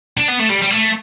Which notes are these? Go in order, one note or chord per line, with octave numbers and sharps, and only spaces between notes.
D4
B3
A3
G3
G3
A3